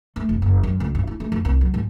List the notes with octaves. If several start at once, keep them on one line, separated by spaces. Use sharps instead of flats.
A3
F1
F#1
F#2
C#2
G2
E4
A3
F2
C2
F#3
G#2